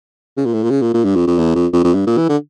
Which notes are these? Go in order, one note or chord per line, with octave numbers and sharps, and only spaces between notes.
C#3
A#2
A2
A#2
C#3
A#2
A#2
G2
F2
F2
E2
F2
F2
F2
G2
A#2
E3
D3